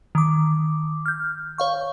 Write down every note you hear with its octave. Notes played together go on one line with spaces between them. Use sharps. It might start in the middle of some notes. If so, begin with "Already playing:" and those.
D#3 D6
F6 G6
C#5 F5 C#6